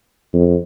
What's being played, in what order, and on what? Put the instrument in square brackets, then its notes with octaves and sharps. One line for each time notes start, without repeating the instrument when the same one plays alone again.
[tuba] F2